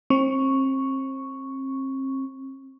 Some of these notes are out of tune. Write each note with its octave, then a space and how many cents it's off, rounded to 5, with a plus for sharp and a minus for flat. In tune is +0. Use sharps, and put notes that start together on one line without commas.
C4 +35 C#6 +0